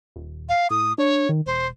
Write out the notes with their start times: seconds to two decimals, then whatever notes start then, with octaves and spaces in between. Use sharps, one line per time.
0.16 D#1
0.49 F5
0.70 A2 D#6
0.98 D4 C#5
1.29 D#3
1.46 E1 C5